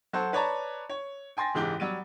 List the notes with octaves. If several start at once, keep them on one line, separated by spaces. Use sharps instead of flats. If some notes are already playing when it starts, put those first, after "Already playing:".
F#3 F#4 A4 C5
B4 C#5 D5 A5 A#5
C#5
G5 G#5 C6 A6 A#6
F#1 G#2 E3 G#3 G4 G7
F#3 G3 D#7